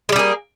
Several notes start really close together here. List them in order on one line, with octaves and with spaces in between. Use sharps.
G#3 G3 G#4 A#3